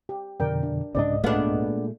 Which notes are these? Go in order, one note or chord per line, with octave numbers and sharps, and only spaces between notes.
G4
F2 B2 D3 A#4 D5 G5
D4
C2 G#2 C#3 C4 D4 D5 D#5
A#2 G#3 A3 B3 D4 F5